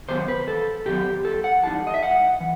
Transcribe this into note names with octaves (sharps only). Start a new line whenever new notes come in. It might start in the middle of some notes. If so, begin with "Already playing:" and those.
C3 D#3 F#3 B3 C5
B4
E2 A4
C3 D#3 F#3 B3 G4
G2 A4
F#5
E3 G3 D#4 A5
D#5
E5
G2 F#5
E3